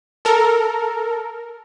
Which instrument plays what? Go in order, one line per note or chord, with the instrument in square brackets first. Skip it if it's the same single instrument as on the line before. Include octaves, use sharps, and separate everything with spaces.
[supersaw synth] A4 A#4